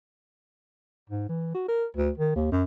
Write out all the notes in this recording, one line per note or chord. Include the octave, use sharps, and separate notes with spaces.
G#2
E3
F#4
A#4
D2
D#3
D#2
F#2